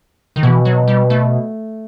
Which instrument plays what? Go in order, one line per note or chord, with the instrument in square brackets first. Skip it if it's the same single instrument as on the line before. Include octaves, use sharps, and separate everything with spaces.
[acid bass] D#3
[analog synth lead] B2 [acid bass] E3
[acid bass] F#3
G3
A3